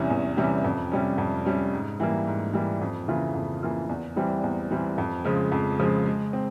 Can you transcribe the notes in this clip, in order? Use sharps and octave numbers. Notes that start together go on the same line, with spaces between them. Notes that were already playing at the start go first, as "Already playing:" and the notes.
Already playing: E2 C3 E3 G3 C#4
E2
C3 E3 G3 C#4
F2
C3 G3 C#4
F2
C3 G3 C#4
G#2
E3 G3 A#3
G#2
E3 G3 A#3
F2
C#3 E3 A#3 F4
F2
C#3 E3 A#3 F4
E2
E3 G3 C4
E2
E3 G3 C4
F2
C#3 F3 G#3
F2
C#3 F3 G#3
G#3
C4